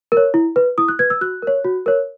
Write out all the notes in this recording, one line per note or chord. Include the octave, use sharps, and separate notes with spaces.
A#4
C#5
E4
B4
E4 D#6
F#6
B4 G#6
E6
F#4 F#6
A#4 C#5
F#4
A#4 C#5